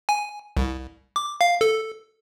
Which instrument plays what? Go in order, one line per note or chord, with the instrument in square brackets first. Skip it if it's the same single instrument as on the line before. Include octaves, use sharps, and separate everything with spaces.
[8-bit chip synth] G#5
C2
D6
F5
A4